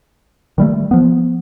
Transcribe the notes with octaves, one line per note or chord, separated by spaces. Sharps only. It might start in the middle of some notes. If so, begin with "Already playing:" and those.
D#3 G3 A3
F3 B3